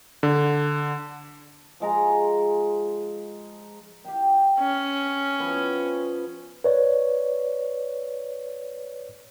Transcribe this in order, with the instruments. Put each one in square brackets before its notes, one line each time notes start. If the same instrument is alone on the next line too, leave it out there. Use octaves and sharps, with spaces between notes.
[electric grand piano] D3
[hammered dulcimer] F3 G#3 A#5
G4 F5 G5
[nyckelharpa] C#4
[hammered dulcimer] F3 B3
[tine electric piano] B4 C#5 D5